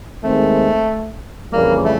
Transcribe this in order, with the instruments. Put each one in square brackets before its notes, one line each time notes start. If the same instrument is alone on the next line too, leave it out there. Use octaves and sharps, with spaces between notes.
[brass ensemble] D#2 D#3 G#3 C4 [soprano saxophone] A3
[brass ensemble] F2 C#3 E3 G3 [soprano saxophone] A#3
[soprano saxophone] A3